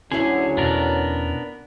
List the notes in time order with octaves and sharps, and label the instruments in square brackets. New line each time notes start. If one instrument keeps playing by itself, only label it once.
[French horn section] D2 F#3 [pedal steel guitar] D3 G#4 [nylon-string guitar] C#4 E4 E5
[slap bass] E2 B2 [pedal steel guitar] B3 D4 A#4